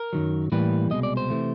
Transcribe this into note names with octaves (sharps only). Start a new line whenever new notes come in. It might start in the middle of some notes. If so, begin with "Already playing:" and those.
Already playing: A#4
F#2 D#3 F#3
A2 E3 G3 A#3 B4
C2 B2 G#3 D#5
D5
C5
C3 E3 A3